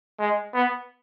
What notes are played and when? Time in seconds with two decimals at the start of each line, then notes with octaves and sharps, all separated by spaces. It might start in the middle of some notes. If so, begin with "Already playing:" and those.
0.19 G#3
0.53 B3